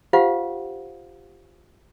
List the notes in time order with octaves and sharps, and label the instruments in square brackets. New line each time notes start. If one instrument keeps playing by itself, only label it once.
[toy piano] F4 G4 C5 F5 F#5